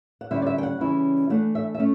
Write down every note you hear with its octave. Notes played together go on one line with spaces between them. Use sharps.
F#5
D3 G3 C#4 E4 E5
D5
E5
G5
F#5
C#3 E3 G3 C#4 E4
E3 A3 D4 F#5
E5
E5
A3 C#4